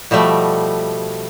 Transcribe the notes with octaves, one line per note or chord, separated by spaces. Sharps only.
B2 F3 G3 A3